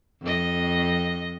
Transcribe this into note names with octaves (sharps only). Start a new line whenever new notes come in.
F2 D#5